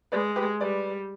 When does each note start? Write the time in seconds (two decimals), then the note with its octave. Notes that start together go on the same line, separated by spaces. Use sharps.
0.12 G#3 B4 D5
0.36 G4 B4
0.60 G3 B4 D5